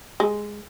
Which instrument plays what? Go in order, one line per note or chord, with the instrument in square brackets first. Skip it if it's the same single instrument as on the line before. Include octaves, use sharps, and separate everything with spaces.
[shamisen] G#3